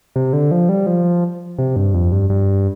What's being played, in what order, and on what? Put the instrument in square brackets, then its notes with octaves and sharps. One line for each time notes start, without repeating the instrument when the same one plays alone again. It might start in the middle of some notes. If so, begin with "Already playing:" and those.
[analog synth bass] C3
D3
F3
G3
F3
C3
G2
F2
G2
G2